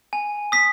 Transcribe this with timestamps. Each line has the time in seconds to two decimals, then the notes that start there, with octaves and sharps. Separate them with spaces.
0.13 G#5
0.52 D#6 B6